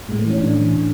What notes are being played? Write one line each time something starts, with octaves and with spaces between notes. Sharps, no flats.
A2 G#3
A3
E3
C#4
A2 D4
E3
A2